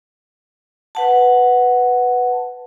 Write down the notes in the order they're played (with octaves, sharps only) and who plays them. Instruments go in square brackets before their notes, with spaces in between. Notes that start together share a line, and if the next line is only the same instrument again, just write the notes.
[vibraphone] B4 F#5 A5